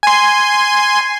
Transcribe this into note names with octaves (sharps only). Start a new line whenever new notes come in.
G#5 C6